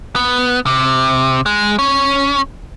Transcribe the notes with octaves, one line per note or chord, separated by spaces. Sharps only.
B3
C3
G#3
C#4